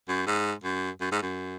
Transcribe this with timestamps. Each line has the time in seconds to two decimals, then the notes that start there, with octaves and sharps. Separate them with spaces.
0.08 F#2
0.27 G#2
0.64 F#2
1.01 F#2
1.11 G#2
1.22 F#2